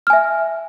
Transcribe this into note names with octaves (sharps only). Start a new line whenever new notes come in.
E5 G#5 F6